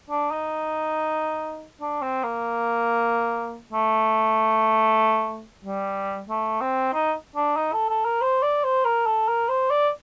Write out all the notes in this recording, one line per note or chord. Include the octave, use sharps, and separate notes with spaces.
D4
D#4
D4
C4
A#3
A3
G3
A3
C4
D#4
D4
D#4
A4
A4
A#4
C5
D5
C5
A#4
A4
A#4
C5
D5